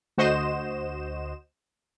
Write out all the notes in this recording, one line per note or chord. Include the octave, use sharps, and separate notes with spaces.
D2 F#4 C5 D#5 E7